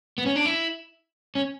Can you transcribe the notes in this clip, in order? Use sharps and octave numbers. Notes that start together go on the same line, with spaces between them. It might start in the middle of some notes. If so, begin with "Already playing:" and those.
B3
C#4
D4
E4
C#4